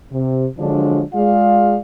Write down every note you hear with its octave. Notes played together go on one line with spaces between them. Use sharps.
C3
D3 F3 F#3 G#3 D4
G#3 F4 G#4 D5 F5